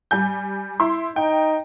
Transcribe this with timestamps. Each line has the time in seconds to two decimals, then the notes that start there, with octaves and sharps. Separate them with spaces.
0.11 G3 G#5 G6
0.80 E4 C6
1.16 D#4 G5